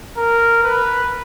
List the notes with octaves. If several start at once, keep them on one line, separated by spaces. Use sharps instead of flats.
A#4
B4